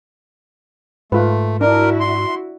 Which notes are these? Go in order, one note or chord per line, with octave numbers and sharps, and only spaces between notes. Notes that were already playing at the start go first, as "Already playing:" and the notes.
G#2 A3 F4 B4
D4 E4 F#4 A#4
C6